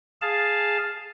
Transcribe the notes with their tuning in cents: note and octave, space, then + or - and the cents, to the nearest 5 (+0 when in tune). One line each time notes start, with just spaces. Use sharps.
G#4 +0 F5 +0 A5 +0